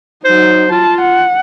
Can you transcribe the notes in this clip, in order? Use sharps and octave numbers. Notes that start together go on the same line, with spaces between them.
F#3 D#4 C5
F4 A5
F#5